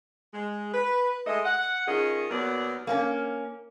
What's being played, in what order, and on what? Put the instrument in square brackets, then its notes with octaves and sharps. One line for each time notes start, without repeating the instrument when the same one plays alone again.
[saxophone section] G#3
B4
G#3 A3 D#5
F#5
D#3 C#4 F4 G#4 D#5
D#2 F#3 B3 A#4 D5
[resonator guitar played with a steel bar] A#3 C4 C#4